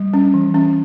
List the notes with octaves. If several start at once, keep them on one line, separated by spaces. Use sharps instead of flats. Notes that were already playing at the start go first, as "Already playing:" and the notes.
Already playing: G3
C#4
E3
C#4